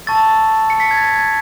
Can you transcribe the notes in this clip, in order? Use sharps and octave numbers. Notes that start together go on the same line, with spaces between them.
A5 C#6 E6 A6
C#7
B6
G#6
A6
G#6